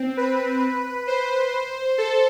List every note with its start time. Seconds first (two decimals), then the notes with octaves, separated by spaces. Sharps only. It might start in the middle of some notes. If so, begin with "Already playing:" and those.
Already playing: C4
0.17 B4
1.07 C5
1.98 A4